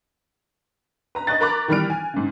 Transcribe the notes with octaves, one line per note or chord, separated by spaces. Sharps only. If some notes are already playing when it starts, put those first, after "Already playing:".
B4 A#5
B4 D#5 C#6 F#6 A6
A#4 A#5 B5 C#6 D6 F#6
D#3 E3 G3 B5 F6 D7
G#5
G#2 C#3